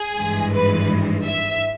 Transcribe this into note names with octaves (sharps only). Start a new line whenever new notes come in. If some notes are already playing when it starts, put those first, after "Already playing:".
Already playing: G#4
G#1 G2 E3 G#3
B4
E5